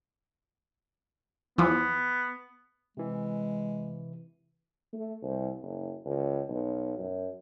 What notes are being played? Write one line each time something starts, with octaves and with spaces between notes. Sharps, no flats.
E2 F3 B3
C3 E3 G#3
A3
C2
F#1
C#2
B1
F#2